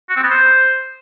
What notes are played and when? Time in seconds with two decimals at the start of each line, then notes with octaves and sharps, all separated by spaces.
0.09 F#4
0.16 C4
0.24 B3
0.31 C5